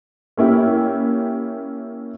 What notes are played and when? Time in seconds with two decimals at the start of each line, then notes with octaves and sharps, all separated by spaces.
0.37 A#3 C#4 E4 G4